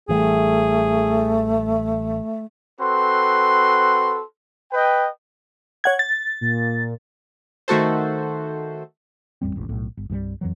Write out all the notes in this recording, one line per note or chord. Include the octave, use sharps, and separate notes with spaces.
A1 E3 G3 A3 G#4
C4 F#4 A4 B4 C6
B4 D#5 G5
C#5 F#5 G#6
A6
A#2
D#3 A3 F#4 A4 C5
A1 F2 G3 C4
E1 A1
B1 A2
G1
C2 G2 E3 G3
F2 E3 F#3